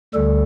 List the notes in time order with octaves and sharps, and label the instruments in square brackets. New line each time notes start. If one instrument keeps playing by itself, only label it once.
[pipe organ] D2 D3 G3 A4